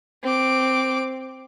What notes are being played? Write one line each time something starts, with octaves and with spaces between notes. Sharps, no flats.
C4 D6